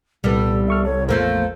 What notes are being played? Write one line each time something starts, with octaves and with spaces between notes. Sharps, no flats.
C2 A#2 G3 B3 A4
A4 E5 C#6 F6
A4 C#5
A1 E2 F3 A3 A#3 C5